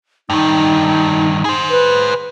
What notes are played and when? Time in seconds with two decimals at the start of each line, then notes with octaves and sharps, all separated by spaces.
0.30 G2 D#3 D#4
1.45 G#4 C5
1.70 B4